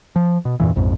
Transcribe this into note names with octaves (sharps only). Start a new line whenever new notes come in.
F3
B2
E2 G2 A#2 E3
A#1 F2 G#2